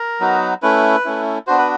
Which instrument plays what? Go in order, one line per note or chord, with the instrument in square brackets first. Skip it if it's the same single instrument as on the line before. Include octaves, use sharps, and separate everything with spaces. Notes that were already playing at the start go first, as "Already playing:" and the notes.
Already playing: [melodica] A#4
F#3 B3 D#4 F#4
A3 C#4 E4 B4
A3 C#4 E4
B3 D4 F#4 C5
B4